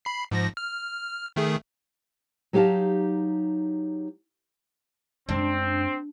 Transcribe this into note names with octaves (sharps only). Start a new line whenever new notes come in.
B5 C7
G#2 F3 A#6
F6
D#3 A3 G#4
F#3 D#4 G4 D#5 F5 A5
F#2 G#3 C4 D4